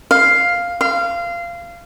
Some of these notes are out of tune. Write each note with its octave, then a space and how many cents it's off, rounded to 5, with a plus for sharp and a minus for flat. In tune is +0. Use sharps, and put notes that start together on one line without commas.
F5 +5
F5 -20